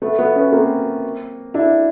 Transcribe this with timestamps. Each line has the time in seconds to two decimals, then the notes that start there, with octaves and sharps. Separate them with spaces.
0.02 A3 B3
0.19 A3 B3
0.36 B3 C#4
0.52 A#3 C4
1.54 D4 E4